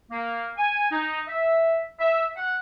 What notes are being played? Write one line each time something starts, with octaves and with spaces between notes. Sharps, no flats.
A#3
G#5
D#4
E5
E5
F#5